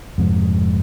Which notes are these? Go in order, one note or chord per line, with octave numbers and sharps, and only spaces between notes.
F2 G#2 C3